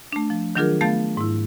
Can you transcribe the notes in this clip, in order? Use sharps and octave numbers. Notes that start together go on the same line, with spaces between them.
A3 D4
F3
D#3 F#3 D4 F4 G#4 A#4
A3 B3 F5 A5 G6 A6
G#2 E4